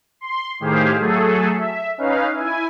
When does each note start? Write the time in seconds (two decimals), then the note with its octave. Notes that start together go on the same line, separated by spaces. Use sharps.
0.21 C6
0.60 A2 D#3 G4 G#4 C5 F5
0.99 F#3 A3 G#4 A4
1.53 E5
1.98 C#4 D#4 B4 F5
2.32 E4 G#5